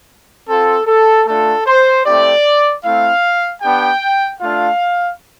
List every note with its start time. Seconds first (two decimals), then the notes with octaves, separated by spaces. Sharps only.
0.48 C4 F4 A4
0.86 A4
1.26 A3 D4 F4 A4
1.66 C5
2.05 A3 C4 E4 G4 D5
2.83 A3 C4 E4 F5
3.62 B3 D4 G4 G5
4.40 A3 D4 F4 F5